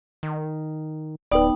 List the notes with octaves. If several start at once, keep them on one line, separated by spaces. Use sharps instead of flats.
D#3
D1 B3 D#4 B4 D5 G5